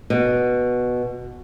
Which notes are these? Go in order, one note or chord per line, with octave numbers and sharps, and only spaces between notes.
B2